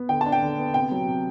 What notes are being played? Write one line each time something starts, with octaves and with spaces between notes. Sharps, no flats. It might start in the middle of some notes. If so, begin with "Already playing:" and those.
Already playing: B3
D3 G5
A5
D4
G5
D3
B3
C3 G5
F#3
C3